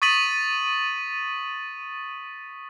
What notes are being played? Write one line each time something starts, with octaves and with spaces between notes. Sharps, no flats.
C#6 D#6 A6 B6 D#7 F#7